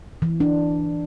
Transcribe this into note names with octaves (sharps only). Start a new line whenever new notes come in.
E3
D4